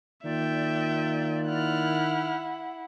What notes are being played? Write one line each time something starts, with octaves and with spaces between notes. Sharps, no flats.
D#3 A#3 F4 D5 E5 G5
E4 F#5 F6 F#6